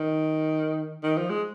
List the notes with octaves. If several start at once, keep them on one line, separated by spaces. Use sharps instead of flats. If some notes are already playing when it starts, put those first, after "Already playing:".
Already playing: D#3
D#3
F3
G#3